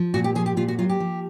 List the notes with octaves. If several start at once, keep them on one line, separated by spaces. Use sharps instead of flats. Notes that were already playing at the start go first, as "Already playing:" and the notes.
Already playing: F3
A#2 F#4
G4
F3 G#4
G4
A#2 F4
F#4
F#3 F4
G4
F3